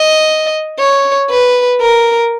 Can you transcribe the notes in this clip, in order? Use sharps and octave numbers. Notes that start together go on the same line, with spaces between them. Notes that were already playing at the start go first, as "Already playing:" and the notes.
Already playing: D#5
C#5
B4
A#4